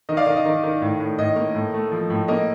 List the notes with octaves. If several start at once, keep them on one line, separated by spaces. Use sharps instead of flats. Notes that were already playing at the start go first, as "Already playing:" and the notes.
D#3 D#5
D5 F5
D#3 D#5
D#5
D#3
D#3
A2
A2
A2 D#5
A#3
A2
A3
F3
A2
A#3 D#5